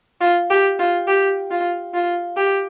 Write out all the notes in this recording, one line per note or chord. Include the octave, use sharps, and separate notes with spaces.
F4
G4
F4
G4
F4
F4
G4